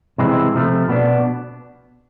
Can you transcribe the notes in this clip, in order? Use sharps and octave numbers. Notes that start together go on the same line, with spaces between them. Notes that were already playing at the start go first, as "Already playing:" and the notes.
C3 E3 G#3 C4 E4
C3 F3 A3
B2 B3 D4